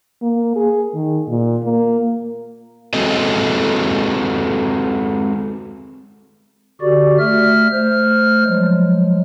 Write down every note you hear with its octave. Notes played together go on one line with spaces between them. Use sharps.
A#3
G#4
D#3
A#2
A#3
G#3 C4 F#4 G#4 A4 D#5
D3 F#4 G4 D5
A3 E5 F6
A3 C5 F6
F3 F#3 G#3